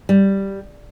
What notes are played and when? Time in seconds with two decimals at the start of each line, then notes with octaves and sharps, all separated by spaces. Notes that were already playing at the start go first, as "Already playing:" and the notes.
0.09 G3